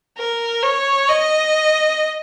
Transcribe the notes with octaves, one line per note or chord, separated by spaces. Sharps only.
A#4
C#5
D#5